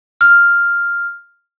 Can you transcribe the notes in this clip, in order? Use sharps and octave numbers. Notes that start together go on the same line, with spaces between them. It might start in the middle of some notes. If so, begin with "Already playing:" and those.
F6